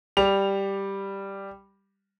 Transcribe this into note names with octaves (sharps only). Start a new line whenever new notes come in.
G3 F7